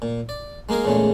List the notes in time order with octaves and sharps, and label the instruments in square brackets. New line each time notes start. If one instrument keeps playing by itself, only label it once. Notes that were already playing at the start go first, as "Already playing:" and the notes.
[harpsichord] A#2
D5
G#3 A#3 D#4 G#4 A#4
E2 A#2 C#3 G#3 A3